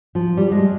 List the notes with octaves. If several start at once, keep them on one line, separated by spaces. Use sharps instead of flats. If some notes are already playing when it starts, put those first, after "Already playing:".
F3
G3
G#3